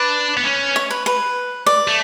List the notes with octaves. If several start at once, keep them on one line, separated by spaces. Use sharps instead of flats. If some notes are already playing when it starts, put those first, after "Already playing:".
Already playing: D4 B4
B3
C#4
C#5
B4
B4
D5
A3